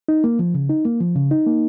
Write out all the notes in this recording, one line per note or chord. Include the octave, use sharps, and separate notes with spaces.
D#4
A#3
F3
C#3
D#4
A#3
F3
C#3
D#4
A#3